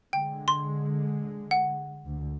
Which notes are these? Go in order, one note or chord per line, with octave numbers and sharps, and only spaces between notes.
D3 G#3 G5
C6
F#5
D2